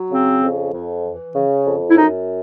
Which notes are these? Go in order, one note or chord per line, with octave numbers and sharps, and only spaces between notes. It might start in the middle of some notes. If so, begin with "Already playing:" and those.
Already playing: F#3
C#3 C4
F2
F2
E3
C#3
F2
E4
F#2 D#4